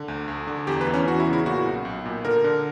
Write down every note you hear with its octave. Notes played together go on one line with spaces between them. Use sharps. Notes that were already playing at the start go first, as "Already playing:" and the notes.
Already playing: D3
D2
D2
D3
E2 G4
B4
E3
C#4
E2 F#4
E4
C#3
E4
A#2 F#4
B1
B1
A#2
D3 A#4
D3